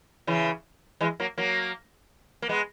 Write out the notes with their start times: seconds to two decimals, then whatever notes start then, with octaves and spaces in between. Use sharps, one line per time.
0.27 C#3 E3
1.01 E3 G#3
1.20 F#3 A#3
1.38 F#3 A#3
2.42 A#3
2.49 G#3 B3